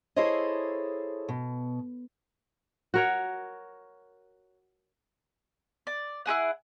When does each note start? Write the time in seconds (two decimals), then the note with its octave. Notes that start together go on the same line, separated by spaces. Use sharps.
0.16 E4 G#4 A4 C5 C#5 D#5
1.29 B2
2.94 F#4 A#4 C#5
5.87 D5
6.26 E4 F#4 G#4 F#5